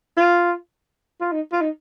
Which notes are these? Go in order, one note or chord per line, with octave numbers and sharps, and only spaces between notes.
F4
F4
D#4
F4
D#4